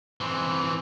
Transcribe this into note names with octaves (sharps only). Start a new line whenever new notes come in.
E3 C4